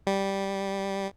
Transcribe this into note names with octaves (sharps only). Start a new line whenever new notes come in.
G3